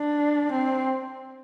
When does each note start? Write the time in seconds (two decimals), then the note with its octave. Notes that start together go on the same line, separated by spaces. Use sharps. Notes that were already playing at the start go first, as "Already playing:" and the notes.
Already playing: D4
0.52 C4